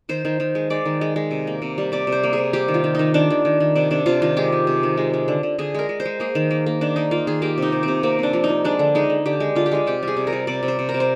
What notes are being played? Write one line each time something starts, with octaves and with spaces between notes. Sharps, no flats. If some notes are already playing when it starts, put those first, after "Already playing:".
D#3 C5
D#3
D#3
G#3
G#3 D5
D#3
G#3
G#3
C3
A#3
C3
G3
C3 D5
C3
C5
A#3
C3 G#4
G3 G4
D#3
F4
D#3
D#3 D#4
D#3 D4
D#3
D#3
D#3
C3 D4
C3 D4
C3 F4
D#3 F4
G#3 G4
G#3
C3
D#3
G#3
G#3
D3
D3
D3 G#4
G#3 A#4
G#3
C5
G#3
A#3 G#4
D#3
A#3
A#3
D#3 D4
A#3 D#4
A#3 F4
D#3 G#4
A#3 G4
C3 D#4
C3
C4
C3
A#3 C4
C3 D4
F3
D#4
F3
G#3 D4
D3
G#3 D#4
D3
D3 G4
G#3
D3 F4
G4
G#3 F4
C3 G4
G3
G#4
C3
A#4
G3
C3 D5
C3
C5
C3
A#4
C3
C5